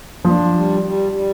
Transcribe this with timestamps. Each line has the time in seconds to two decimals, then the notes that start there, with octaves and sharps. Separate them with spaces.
0.25 F3 D4
0.54 G3
0.83 G3
1.12 G3